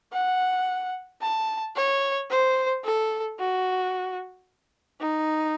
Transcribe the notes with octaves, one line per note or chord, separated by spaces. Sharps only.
F#5
A5
C#5
C5
A4
F#4
D#4